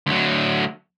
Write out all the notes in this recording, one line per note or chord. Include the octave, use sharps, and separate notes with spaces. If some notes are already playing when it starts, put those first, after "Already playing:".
D2 F#3